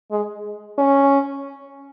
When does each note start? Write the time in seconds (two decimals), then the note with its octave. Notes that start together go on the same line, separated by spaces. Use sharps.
0.11 G#3
0.79 C#4